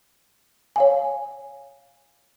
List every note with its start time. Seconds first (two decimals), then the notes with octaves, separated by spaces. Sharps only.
0.76 C#5 F5 G#5